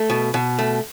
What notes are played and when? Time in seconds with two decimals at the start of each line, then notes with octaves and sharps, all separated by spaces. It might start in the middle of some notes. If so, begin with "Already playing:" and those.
Already playing: A3
0.10 B2
0.34 B2
0.59 A3